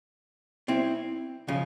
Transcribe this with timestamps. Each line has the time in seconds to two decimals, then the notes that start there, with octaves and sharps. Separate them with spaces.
0.68 C4 E4
1.48 C#3 F3